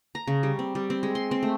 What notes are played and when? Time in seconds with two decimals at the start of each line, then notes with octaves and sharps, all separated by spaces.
0.15 A#5
0.27 C#3
0.43 G3
0.59 C4
0.75 G3
0.90 C4
1.03 G#3
1.15 C6
1.31 C4
1.43 A3